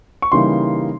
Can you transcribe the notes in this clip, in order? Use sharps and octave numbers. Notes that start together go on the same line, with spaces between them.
C#6
C#3 E3 G3 A#3 D#4 C6